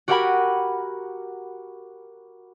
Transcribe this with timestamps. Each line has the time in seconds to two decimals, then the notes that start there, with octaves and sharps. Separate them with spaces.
0.08 F#4 G4 A#4 F#5 G#5 B5